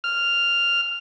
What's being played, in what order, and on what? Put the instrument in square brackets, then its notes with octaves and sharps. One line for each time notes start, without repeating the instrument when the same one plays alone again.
[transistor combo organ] F6